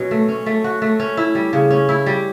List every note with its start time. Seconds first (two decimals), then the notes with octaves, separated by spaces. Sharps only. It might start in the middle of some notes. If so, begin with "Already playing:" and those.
Already playing: B2 F#3 C#4
0.11 A3
0.28 C#4
0.46 A3
0.64 F#4
0.82 A3
1.00 C#4
1.17 E4
1.35 G3
1.53 C#3
1.70 C#4
1.89 E4
2.06 G3